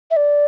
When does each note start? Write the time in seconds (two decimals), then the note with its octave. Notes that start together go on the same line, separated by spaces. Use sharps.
0.11 E5
0.17 D5